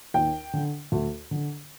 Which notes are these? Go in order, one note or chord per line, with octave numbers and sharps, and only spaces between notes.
D#2 G5
D3
D2
D3